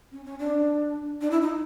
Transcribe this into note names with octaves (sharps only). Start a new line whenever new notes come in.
C#4
C#4
D4
D4
E4
D#4